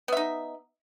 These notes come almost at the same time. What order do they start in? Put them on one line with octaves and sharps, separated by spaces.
B3 E5 D#4